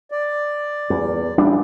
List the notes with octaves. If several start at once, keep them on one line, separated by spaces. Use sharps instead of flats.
D5
E2
A1 G3 D4